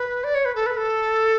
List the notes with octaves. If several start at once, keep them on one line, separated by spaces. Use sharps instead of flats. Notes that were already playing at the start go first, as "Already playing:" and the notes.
Already playing: B4
D5
C#5
B4
A4
B4
A4